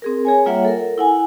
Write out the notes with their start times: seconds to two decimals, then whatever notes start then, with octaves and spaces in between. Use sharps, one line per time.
0.02 C4 G#4 A#4
0.25 G#4 C#5 G#5
0.46 G3 A#3 F4 C#5 E5 F#5
0.65 A4 A#4
0.98 E4 F#5 G#5